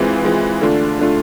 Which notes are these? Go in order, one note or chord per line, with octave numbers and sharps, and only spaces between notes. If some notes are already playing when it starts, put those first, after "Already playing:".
Already playing: E3 G#3 C4 F4
E3 G#3 C4 F4
D3 A3 D4 F4
D3 A3 D4 F4